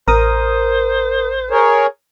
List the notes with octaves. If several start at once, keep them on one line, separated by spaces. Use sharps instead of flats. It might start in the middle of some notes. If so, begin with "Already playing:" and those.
A1 A#4 C5 D#6
G#4 A#4 C#5